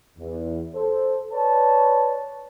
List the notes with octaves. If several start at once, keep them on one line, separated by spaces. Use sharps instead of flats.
E2
A4 C5
B4 C#5 D5 A5